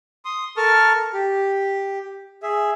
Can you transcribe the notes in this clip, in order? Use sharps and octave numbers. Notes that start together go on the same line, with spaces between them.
C6 D#6
A4 A#4 A5 C#6 F6
G4
G#4 E5